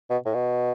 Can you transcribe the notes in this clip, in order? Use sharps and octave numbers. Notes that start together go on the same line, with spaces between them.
B2
A2
B2